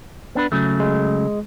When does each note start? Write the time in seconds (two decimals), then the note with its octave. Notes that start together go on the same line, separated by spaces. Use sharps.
0.35 B3 D4 B4
0.52 C#3 F#3 A3
0.80 G#3